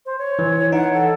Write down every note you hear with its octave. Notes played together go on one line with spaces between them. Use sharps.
C5
C#5
E3
D#4 F#5
A4